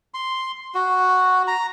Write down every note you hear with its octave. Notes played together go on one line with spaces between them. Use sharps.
C6
F#4
A#5